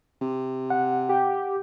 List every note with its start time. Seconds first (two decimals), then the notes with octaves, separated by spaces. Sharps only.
0.21 C3
0.70 F#5
1.09 G4